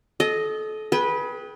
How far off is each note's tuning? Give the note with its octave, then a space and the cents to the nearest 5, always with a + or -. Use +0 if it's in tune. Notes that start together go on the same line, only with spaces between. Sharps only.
A4 -30 D#5 +0
G#4 +25 B4 -15 G5 +10